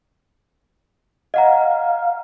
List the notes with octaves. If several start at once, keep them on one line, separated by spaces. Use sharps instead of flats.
D#5 F5 F#5 A#5